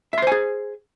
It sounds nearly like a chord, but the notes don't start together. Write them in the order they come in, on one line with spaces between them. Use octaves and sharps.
E5 C6 C5 G#5 G#4